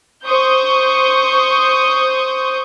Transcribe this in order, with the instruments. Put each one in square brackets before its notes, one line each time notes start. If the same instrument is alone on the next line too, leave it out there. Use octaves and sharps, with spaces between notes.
[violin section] C5 C#6 D#6 G6